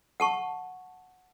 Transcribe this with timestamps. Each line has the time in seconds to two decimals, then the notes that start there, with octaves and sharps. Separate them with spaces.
0.20 F#5 A5 C#6